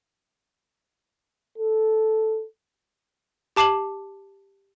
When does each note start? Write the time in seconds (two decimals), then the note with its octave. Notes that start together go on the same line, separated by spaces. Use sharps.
1.58 A4
3.56 G4 A5 D6 C7 E7 F#7